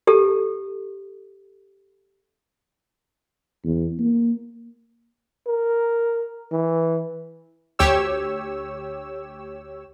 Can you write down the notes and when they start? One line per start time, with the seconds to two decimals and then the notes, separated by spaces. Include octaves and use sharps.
0.07 G4 A4 A5
3.65 E2
3.99 A#3
5.46 A#4
6.52 E3
7.79 D2 G4 C#5 E6